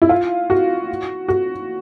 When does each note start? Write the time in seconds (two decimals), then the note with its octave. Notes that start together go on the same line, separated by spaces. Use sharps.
0.02 E4
0.09 F4
0.50 F#4
1.28 F#4